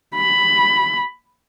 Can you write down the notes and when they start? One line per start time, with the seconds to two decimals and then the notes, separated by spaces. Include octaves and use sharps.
0.15 B5